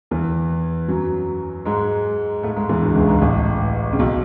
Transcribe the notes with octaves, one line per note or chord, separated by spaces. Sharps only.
E2 E3
F#2 F#3
G#2 G#3
A2 A3
G#2 G#3
E2 E3
D2 D3
C#2 C#3
G#2
A1 A2
C#3
B1 B2